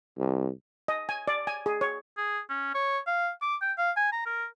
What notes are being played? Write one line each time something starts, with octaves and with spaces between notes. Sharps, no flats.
C2
D#5
G#5
D5
G#5
G#4
C#5
G#4
C#4
C#5
F5
D6
G5
F5
G#5
A#5
A#4